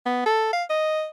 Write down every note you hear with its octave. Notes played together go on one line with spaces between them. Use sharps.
B3
A4
F5
D#5